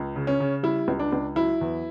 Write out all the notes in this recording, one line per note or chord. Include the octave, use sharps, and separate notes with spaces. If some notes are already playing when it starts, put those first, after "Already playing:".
Already playing: C#2
C#3
C#4
C#3
G3 E4
C#2
D4
C#2
F#3 E4
E2